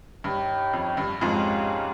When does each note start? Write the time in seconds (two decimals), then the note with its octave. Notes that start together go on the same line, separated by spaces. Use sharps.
0.24 G2 D#4 G4 C#5 G5
0.73 F2
0.97 G2
1.21 F2 G#2 G#3 C#4 G4 A#4 F5